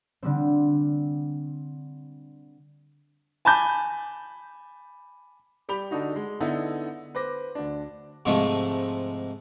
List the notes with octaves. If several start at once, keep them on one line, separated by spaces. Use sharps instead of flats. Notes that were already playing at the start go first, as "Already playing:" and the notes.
D3 G3 C4
G#5 A5 B5 D6 G6
G3 G4 G5 B5 F7
D3 D4 D#4 F#4
G#3
D3 B3 D#4 E4
B4 C5 D6 A#6
D2 D4
G#2 C3 F3 G#3 A3